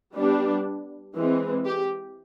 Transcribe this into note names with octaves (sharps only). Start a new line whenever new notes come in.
G3 B3 D4
E3 G#3 C4
G4